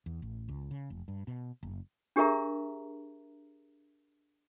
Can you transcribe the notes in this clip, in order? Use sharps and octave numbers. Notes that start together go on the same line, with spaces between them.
E2
A1
C#2
C#3
F1
G2
B2
F#1
D4 G4 G#4 A#4 E5 A#5